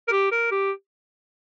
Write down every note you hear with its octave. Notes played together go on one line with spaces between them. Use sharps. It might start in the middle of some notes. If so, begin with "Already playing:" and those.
A#4
G4
A#4
G4